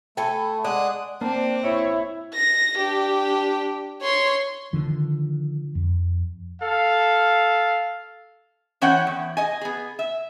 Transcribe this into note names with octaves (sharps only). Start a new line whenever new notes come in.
A3 A4 G5 G#5 B5
G#3 D4 D5 F#5 D#6 F#6
A#3 C4 D4
E4 C#5
A#6
D4 G4
C#5 C6
D3 D#3 F3
F2
A4 F5
E3 C#4 C#5 F#5 G5
E2
D#5 G#5
B3 G#4
E5